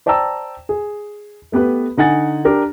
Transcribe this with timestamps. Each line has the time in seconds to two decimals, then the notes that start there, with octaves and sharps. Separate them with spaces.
0.06 C5 D5 G5 A5 A#5 E6
0.69 G#4
1.52 A3 B3 G4 B4
1.97 D3 D#4 F#5 G#5 A6
2.45 D4 G4 A#4 A#5